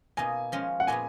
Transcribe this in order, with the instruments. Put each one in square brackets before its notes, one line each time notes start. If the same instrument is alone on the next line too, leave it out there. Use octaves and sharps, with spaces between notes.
[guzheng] B2 A#3 D#4 [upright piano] G#5
[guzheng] F3 G#3 C#4 F4
[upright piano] F#5
[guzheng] A#2 G#3 B3 [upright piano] G#5